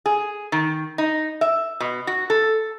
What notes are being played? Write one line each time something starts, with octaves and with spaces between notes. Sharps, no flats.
G#4
D#3
D#4
E5
B2
F#4
A4